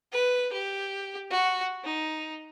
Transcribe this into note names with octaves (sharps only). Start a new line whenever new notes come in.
B4
G4
F#4
D#4